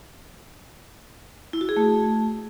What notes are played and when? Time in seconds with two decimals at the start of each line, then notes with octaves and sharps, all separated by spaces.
1.53 E4
1.61 F#4
1.69 G#4
1.76 A3